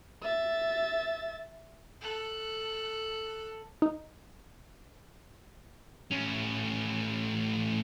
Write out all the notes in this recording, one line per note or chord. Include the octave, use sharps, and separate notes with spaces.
E5 A6
A4 F#6
D#4
A2 C#4